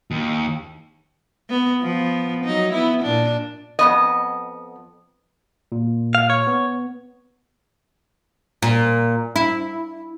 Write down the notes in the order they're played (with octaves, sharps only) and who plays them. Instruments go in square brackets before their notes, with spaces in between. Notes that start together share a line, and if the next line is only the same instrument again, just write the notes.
[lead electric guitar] D#2
[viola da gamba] B3
F3 B3
F#3 D#4
B3 E4
A#2 D4
[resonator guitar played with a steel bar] F2 B3 D#5
[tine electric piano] A#2
[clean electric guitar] F5
C#5
[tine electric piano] B3
[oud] A#2
E4